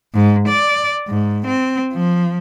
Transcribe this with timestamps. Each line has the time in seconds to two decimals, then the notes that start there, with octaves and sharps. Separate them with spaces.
0.14 G#2
0.48 D5
1.08 G#2
1.47 C4
1.93 F3